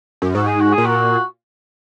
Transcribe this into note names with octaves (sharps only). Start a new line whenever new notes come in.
F#2
G#2 F#4
G#4
F#4
A#2 G#4
F#4